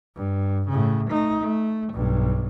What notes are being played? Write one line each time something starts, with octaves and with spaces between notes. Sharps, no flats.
G2
A2 C#3
A3 D#4
A3
B1 G2